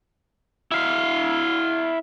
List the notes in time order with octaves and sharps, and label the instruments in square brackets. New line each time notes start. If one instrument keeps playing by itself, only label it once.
[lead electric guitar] E4 F5